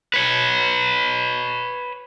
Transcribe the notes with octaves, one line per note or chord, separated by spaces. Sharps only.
B4 C#5